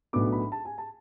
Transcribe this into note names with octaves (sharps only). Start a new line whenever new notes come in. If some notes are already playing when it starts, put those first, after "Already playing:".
B1 A2 F#3 B3 D4 D6
B5
A5
G#5
A5